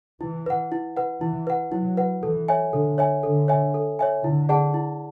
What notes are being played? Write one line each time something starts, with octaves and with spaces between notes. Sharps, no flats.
E3 E4
B4 F#5
E4
B4 F#5
E3 E4
B4 F#5
F#3 E4
B4 F#5
E3 A4
C#5 E5 G#5
D3 A4
C#5 E5 G#5
D3 A4
C#5 E5 G#5
A4
C#5 E5 G#5
D3 E4
G#4 D5 F#5 A5
E4